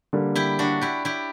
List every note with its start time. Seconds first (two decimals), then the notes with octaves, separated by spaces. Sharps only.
0.13 D3 G3 A#3
0.36 E4 G4
0.59 D4 F#4
0.81 E4 G4
1.05 E4 G4